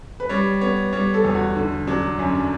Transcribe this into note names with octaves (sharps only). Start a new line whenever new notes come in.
B4
G3 C#5
B3 C#5
G3 C#5
A4
E2
F#4
D3
F#3 D4
F#2 C#4
D4